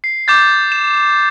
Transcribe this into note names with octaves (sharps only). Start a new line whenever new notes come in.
C7
D6 G6 A6
E7